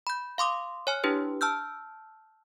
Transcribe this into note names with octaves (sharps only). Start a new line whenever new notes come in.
B5 G6
F5 C6 D6 D#6
C#5 G#5 F6
D4 E4 G4 B4
A5 E6 F6 G6